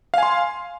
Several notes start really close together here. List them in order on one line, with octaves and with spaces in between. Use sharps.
F5 G#5 C6